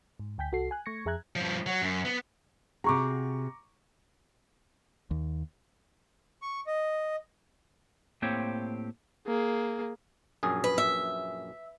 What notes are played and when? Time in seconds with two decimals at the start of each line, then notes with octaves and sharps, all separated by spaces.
0.20 G#2
0.38 D2 G5 G#5 G6 B6
0.52 C2 F#4 A4 C7
0.71 G#5 F#6
0.86 A3 C#6 G#6 A#6 C#7
1.06 F2 G#4 E5 A#5 F#6 G#6
1.36 G2 F3
1.67 F#3
1.82 F#2
2.05 B3
2.84 C3 F#4 G#4 A#5 C#6 D6
5.11 D#2
6.42 C#6
6.67 D#5
8.22 A2 A#3 C4 G4 C5 C#5
9.27 A#3 G#4
10.43 A#1 F#2 G#4
10.64 B4
10.78 E5